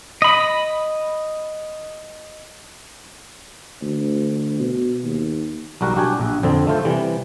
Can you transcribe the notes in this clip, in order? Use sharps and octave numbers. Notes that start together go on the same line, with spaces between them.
D#5 B5
D2
B2
D#2
B1 G3 F#4 A#4 F#5
D4 F#4 G4 F#5 G#5
A#1
F2 D3 C4
A3 F4 C5
C3 E3 G3